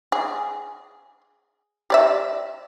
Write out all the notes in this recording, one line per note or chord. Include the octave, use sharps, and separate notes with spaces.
G#4
G4 D5 E5